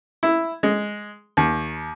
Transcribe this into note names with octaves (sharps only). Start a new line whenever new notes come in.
E4
G#3
D#2